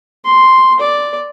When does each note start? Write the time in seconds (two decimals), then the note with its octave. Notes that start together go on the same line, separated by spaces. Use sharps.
0.24 C6
0.80 D5